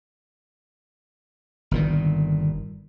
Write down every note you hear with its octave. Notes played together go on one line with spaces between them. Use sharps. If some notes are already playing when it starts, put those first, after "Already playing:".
G1 A#2 D#3